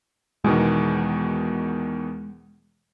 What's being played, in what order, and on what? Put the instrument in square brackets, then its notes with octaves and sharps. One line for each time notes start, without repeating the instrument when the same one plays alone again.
[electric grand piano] E2 B2 D#3 [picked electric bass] G#3